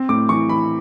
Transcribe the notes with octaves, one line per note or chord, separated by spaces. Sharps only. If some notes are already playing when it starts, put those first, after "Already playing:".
Already playing: C4
A2 D6
E3 C#6
E3 B5